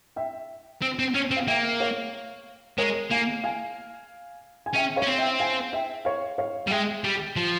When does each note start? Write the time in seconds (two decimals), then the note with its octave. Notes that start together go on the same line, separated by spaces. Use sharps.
0.16 E5 G5
0.82 C4
0.99 C4
1.14 C#4
1.31 C4
1.37 F5
1.47 A#3 E5 G5
1.80 C#5 F5
2.78 G#3 A#4 C#5
3.11 A#3 F5 G#5
3.44 F5 G#5
4.66 G#5
4.74 C#4 E5 G5
4.96 C#5 F5
5.02 C#4
5.07 C4
5.18 E5 G5
5.40 F5 G#5
5.73 E5 G5
6.05 C#5 F5
6.38 C#5 F5
6.67 G3
6.71 G#3 E5 G5
7.04 G3
7.36 F3